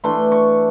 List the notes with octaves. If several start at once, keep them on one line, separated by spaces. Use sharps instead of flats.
E3 A3 D4 C6
C#6